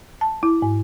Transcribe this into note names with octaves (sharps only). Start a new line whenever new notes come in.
A5
E4
G#2